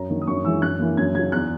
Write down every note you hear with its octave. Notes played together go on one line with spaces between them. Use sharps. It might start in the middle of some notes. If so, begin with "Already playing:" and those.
Already playing: F#2 A#5
D#3 A#3
D#6
F#2 C#6
E3 G#3 E6
F#2 F#6
E3 A#3
F#2 G#6
C#3 F#3 G#6
E2 F#6